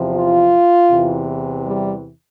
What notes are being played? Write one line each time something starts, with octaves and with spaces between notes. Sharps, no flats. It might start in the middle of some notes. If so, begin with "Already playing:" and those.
Already playing: E2 C3 F3
F4
E2 C3 E3
G3